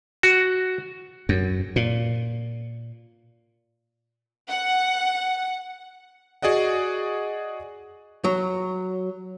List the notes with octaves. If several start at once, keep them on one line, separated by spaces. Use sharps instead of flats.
F#4
F#2
A#2
F#5
F#4 G#4 D5 D#5 F#5
F#3